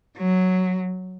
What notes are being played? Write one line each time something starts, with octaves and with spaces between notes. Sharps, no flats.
F#3